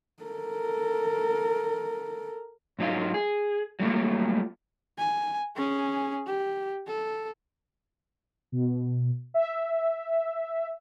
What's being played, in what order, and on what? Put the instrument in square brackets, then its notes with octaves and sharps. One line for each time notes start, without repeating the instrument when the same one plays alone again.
[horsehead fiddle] A4 A#4
[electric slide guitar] G#2 F#3 D#4 F4
G#4
F#3 G3 A3 A#3 F4
[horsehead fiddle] G#5
C#4 G#4
G4
A4
[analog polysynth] B2
E5